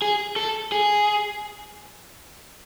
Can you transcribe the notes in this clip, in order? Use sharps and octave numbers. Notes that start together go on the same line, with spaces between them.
G#4
A4
G#4